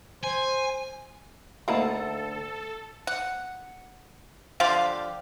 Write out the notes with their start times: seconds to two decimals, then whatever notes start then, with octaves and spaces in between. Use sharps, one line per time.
0.24 C5 G#5
1.68 D2 A#3 D#4 E4 A4 F#5 A5
3.07 F#5
4.60 D3 F3 G4 F5